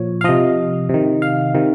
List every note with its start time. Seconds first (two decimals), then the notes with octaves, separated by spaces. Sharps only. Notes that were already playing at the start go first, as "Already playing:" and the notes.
Already playing: A#2 F3 C#5
0.21 F5
0.24 C3 F3 D#5
0.89 C3 D#3
1.22 F5
1.55 C3 D#3